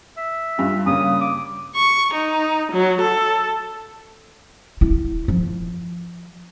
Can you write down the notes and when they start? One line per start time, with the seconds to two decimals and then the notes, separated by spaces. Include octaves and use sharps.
0.17 E5
0.58 G2 F4
0.86 G2 C#3 A#3 D#6
1.21 D6
1.76 C#6
2.14 D#4
2.72 F#3
3.01 A4
4.81 E4
5.28 F3